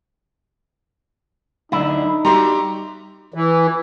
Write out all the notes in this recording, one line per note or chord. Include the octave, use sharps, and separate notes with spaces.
D2 D3 F#3 D#4 E4
G3 F#4 G4 E5 A#5 C6
E3